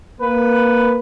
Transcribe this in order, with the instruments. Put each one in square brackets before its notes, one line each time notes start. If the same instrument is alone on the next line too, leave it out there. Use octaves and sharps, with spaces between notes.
[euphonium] A#3 [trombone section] B4